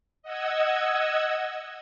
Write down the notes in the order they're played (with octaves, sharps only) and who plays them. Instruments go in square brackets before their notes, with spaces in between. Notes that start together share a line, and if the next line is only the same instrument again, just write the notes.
[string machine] D#5 F#5 E6 G#6